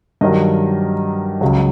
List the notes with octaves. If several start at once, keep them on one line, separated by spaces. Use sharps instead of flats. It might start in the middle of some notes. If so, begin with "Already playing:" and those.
G2 D#3 F#3 D#5
C#2 C#3 F#3